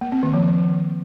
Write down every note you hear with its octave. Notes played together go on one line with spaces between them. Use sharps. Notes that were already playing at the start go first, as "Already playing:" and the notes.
A#3
C4
D#3
F3